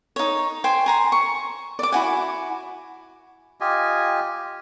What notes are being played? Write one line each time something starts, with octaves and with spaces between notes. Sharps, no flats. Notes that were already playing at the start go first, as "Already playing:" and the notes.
D#4 C#5
C5 G5 G#5
G#5 A#5 C6
C#6
D5 D6
E4 F#4 G#5
F4 G4 D#5 G#5